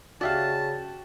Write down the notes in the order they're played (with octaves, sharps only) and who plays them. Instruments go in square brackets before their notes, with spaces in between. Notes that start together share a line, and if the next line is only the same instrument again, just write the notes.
[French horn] C#3 [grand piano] F#4 G4 [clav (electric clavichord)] D5 E5 F5 [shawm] A5